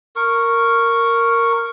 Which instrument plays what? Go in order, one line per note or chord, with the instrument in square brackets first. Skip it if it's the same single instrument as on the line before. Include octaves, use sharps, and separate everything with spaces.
[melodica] A#4 C#6